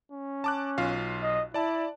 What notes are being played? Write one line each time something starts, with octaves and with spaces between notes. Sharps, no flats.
C#4
A5 D6 F#6
B1 F4 F5
D#5
E4 D5 A5